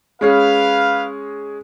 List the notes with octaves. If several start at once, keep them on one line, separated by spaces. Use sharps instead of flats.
G#3 C#4 G#4 B4 F5